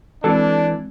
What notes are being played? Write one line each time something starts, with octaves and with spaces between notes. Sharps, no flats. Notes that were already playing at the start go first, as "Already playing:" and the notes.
E3 G#3 C4 D4 F#4 A4